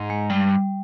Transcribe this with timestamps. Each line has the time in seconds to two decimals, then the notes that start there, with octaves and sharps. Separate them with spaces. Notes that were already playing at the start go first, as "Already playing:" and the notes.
Already playing: G#2
0.10 G#3
0.30 G2 G3